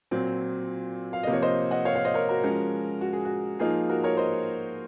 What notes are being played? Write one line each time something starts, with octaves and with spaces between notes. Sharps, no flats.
A#2 F#3 C4
F5
C3 F3 A#3 D#5
C#5
C5 D#5
D#5 F#5
C#5 F5
C#5 F5
C5 D#5
A#4 C#5
F#4 A#4
F3 G#3 C#4
F#4
G#4
F#4
F3 A#3 D#4 F4 G#4
F#4 A#4
A#4 C#5
C5 D#5